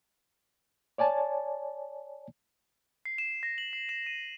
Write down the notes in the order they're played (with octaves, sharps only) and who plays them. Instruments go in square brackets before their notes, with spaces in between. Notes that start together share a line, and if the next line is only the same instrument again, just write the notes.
[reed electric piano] C#5 D5 G#5 A5
[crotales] C7
E7
A#6
F#7
C7
E7
D#7